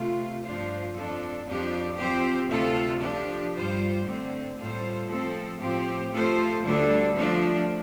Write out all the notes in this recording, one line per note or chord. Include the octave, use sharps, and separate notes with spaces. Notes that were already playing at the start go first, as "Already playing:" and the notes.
Already playing: C3 A3 F4
G2 F3 D4 F4 C5
F2 F3 D4 A4
F2 F3 D4 G4
F3 C4 G4 C5
D2 C3 A3 F4 A4
F3 D4 G4
G2 G3 F4 C5
D3 A3 C4
A2 G3 F4 A4 C5
F3 A3 C4 A4 C5
A2 F3 C4 G4 C5
F3 A3 F4 A4 C5
D2 D3 G3 D4 A4
F3 A3 D4